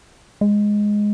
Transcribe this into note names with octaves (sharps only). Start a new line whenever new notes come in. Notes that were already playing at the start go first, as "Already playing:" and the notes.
G#3